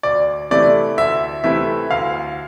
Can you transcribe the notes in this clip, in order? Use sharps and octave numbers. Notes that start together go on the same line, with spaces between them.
D2 D5
C3 E3 A3 E4 D5
D2 E5
C3 E3 A3 E4 E5
D2 F5